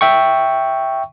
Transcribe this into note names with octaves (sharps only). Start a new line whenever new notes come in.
E5 G5 C#6